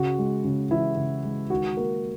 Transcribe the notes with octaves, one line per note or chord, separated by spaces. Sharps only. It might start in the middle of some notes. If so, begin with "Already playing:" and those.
Already playing: C#3 F#4
G#3
C#3
E3 E4
C#3
G#3
D#3 F#4
A#3 A#4